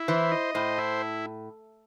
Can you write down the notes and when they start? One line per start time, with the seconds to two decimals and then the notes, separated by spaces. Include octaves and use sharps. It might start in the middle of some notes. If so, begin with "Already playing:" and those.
Already playing: E4
0.08 E3 C5
0.32 D#5
0.55 A2 C5
0.78 E4